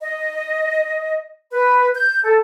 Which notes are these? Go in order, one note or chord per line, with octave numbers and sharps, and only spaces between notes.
D#5
B4
G6
A4